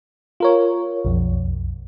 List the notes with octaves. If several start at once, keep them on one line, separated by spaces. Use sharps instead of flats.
F4 A#4 C#5
B1 F2